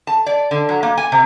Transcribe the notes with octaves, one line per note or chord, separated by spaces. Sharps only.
A5
D5
D3
F#3
A#3
G#5
C3